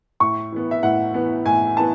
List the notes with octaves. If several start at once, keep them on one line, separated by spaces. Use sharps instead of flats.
A2 C#6
E3 B3
E5
A2 F#5
E3 B3
A2 G#5
E3 B3 A5